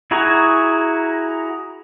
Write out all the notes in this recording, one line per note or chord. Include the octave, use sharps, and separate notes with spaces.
E4 F#4 G#4 A#5